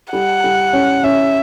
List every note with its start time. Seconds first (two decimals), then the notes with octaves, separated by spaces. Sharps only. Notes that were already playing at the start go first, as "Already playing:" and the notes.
0.13 G3 F#5
0.44 G3
0.73 C#4
1.04 C#4 E5